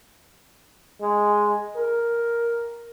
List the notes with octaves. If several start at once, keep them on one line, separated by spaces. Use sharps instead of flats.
G#3
A#4